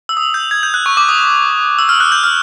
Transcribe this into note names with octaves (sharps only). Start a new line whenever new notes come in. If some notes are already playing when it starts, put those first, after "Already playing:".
E6
D#6
G6
G#6
G6
F#6
C#6
D6
D#6
E6
F6
F#6
G6
F6